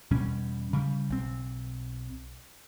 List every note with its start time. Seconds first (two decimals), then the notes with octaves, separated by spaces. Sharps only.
0.11 E2 B2 G3 C#4
0.73 C#3 G3
1.10 B1 C4